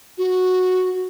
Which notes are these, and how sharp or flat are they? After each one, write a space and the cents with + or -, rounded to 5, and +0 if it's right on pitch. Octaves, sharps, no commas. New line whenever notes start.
F#4 -5